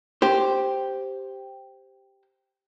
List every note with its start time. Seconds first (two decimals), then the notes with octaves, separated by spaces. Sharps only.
0.22 G4 C5